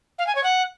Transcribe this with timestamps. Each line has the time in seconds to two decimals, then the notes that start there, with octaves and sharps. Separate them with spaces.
0.18 F5
0.26 G#5
0.35 C#5
0.43 F#5